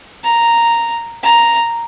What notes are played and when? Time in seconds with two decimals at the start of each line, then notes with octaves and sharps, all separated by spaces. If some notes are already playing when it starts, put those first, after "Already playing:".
0.24 A#5
1.23 A#5